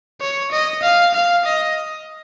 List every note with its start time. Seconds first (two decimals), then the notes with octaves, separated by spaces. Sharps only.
0.21 C#5
0.52 D#5
0.82 F5
1.14 F5
1.45 D#5